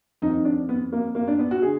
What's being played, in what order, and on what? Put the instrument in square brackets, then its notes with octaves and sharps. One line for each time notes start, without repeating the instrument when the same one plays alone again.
[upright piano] F2 D#3 D#4
D4
B3
A#3
A#3
D4
B3
F#4
D3 G#4